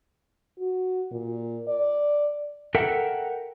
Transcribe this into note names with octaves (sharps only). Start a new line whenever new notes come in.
F#4
A#2
D5
A4 A#4 E5 F#5 G5